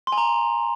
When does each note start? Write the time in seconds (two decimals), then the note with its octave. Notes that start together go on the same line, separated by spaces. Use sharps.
0.07 C6
0.12 G#5
0.18 A#5